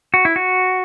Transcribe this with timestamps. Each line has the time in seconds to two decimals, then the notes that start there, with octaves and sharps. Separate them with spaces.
0.14 F#4
0.25 E4
0.36 F#4